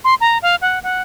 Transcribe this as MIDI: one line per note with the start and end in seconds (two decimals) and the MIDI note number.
0.04 0.15 84
0.21 0.38 82
0.43 0.56 77
0.62 0.79 78
0.83 1.02 78